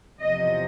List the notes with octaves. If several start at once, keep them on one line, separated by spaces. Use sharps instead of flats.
E2 C3 F3 D#5